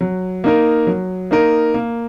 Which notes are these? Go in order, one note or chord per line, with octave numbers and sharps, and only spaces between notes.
F#3
A#3 D#4 A#4
F#3
A#3 D#4 A#4
A#3